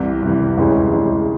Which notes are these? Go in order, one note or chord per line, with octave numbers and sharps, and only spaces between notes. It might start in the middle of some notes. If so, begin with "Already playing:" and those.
Already playing: C2 C3 E3
C2 C3 E3
D2 C3 E3 G#3 C#4
D2 C3 E3 G#3 C#4